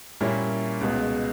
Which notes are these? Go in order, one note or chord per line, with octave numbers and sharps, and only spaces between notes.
A#2 G3 A#3 C#4 E4
C#2 B2 G#3